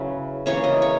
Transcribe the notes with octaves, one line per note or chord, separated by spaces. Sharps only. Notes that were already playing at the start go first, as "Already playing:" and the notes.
Already playing: C#3 F#3 C#4 E4 B4
C#3 E3 A#3 C#4 C#5
D#5
C#5